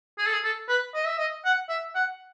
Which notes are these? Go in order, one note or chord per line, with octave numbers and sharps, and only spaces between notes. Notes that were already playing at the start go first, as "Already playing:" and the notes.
G#4
A4
G#4
A4
B4
D#5
E5
D#5
F#5
E5
F#5